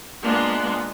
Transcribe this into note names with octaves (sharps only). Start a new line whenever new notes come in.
G#3 A#3 B3 D4 F4